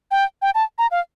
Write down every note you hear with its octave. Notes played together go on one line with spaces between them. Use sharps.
G5
G5
A5
A#5
F5